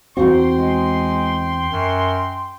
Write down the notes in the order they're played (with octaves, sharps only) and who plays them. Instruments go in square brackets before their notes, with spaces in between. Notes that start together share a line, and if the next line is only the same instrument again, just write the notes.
[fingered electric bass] E2 C4 [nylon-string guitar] D#4 F#4 [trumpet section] G5 C6
[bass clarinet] G#3
F#2